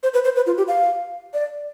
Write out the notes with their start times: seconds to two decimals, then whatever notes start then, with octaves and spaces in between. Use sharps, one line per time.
0.03 C5
0.14 B4
0.24 C5
0.36 B4
0.47 F4
0.57 G4
0.68 F5
1.34 D5